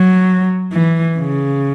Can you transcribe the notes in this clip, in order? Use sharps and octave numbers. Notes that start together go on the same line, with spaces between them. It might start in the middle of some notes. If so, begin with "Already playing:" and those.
Already playing: F#3
E3
C#3